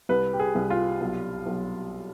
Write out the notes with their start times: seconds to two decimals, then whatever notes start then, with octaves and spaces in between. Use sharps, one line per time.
0.09 C2 B4
0.33 G4
0.39 G#4
0.55 C2
0.70 F4
1.01 B1
1.46 B1